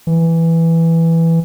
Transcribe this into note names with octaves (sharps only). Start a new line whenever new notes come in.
E3